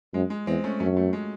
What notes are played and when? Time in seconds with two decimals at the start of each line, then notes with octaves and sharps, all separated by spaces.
0.14 F#2 G#3
0.30 G#3
0.47 E2 G#3 C4
0.64 A3 C#4
0.80 F#2 A3 C#4
0.97 F#3 A3
1.13 G#3